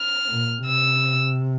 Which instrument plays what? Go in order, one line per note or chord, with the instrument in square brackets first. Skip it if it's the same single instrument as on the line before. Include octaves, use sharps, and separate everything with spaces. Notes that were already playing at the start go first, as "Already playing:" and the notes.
Already playing: [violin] F6
[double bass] A#2
[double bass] C3 [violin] E6